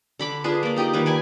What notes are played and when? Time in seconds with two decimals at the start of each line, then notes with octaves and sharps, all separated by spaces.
0.19 D3 B5 D6
0.44 D4 F4 G#4 B4
0.63 A#3 D5
0.76 D#4 G4 D5 D#5
0.94 D#3 G3 A#3 B4
1.06 B4 D5 G#5